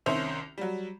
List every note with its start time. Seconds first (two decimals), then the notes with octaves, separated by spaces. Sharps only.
0.06 C2 D#3 C#4 C5 E5 F7
0.58 F#3 G3